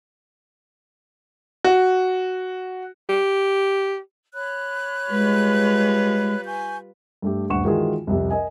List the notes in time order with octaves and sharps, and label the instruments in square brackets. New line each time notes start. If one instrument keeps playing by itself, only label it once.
[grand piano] F#4
[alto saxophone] G4
[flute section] C#5 B5 F#6
[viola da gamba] G3 F4 B4 [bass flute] G#3
[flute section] G#5 C#6 G6
[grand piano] G2 A3 G4
D#1 D2 G2 F#5 C#6 E7
D#3 E3 G#3 F4 F#4 G#4
C2 F2 C3
A#4 D#5 G#5